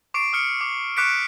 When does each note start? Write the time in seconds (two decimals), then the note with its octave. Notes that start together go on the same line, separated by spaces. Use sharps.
0.14 C#6 D6 C7 D7
0.33 D#6 F6 C#7
0.61 D6
0.97 C#6 D6 F#6 B6 C#7 D7